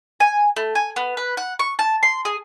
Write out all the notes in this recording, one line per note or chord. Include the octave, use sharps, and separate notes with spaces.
G#5
A3
G#5
B3
B4
F#5
C#6
A5
C6
G#4